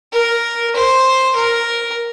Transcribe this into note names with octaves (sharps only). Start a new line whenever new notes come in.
A#4
C5
A#4